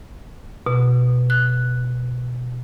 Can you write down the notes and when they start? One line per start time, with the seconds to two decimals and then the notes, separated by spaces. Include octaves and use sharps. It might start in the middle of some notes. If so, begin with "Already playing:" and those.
0.66 B2
1.30 F#6